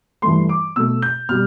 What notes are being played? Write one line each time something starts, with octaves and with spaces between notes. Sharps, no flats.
G2 E3 A3 C6
D6
B2 A3 E6
G6
B2 G3 F6